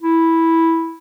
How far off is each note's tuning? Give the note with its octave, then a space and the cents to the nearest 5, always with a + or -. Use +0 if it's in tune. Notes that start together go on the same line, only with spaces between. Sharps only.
E4 -5